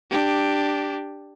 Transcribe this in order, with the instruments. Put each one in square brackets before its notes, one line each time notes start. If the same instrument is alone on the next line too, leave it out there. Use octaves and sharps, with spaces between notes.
[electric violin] D4 G4